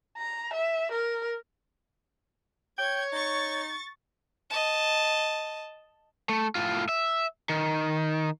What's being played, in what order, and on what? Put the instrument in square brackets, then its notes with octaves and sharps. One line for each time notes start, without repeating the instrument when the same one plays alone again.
[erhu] A#5
E5
A#4
[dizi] C#5 [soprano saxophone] G5 [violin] G#6
[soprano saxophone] D#4 [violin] C#6 A6
[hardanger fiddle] D#5 A5
[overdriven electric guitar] A3
A2 F4
E5
D#3